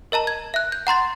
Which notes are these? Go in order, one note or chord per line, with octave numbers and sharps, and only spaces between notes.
A#4 D#5 A5 A#5
G#6
E5 F#6
G6
F#5 A#5 C6 A6